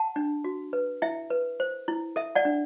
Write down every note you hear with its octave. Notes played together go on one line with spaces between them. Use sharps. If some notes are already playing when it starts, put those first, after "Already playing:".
Already playing: F#5 A5
D4
F#4
B4
E4 E5 G5
B4
C5
E4
A4 E5
D5 F#5
D4